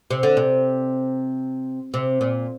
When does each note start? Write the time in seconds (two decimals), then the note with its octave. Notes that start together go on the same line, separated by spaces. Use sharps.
0.10 C3
0.23 D3
0.37 C3
1.94 C3
2.21 A#2